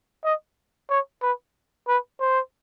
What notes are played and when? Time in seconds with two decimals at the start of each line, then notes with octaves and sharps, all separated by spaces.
0.24 D#5
0.90 C#5
1.22 B4
1.88 B4
2.20 C5